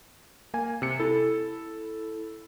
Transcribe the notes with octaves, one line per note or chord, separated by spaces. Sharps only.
A#3 G#5
C3 C#7
E4 A4